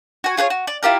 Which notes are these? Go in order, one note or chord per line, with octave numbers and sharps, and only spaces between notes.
F#4 G#5
F4 G#4 B4 C#5
F#4
D5
E4 F4 G4 A#4